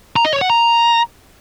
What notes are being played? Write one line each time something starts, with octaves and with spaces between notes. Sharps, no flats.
A#5
D#5
C#5
F#5
A#5